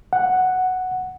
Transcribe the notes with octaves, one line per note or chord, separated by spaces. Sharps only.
F#5